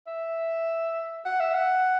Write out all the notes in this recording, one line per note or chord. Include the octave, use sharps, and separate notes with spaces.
E5
F#5
E5
F#5